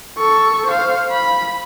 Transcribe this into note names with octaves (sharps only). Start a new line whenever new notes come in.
A4 C#6
C5 F5
B5